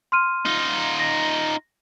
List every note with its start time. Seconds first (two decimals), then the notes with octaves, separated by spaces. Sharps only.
0.12 C6 F6 D#7
0.45 D#4 F4
0.99 A#6